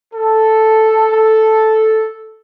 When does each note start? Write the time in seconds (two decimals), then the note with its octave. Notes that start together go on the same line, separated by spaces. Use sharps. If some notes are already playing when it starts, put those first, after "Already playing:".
0.14 A4
1.10 A4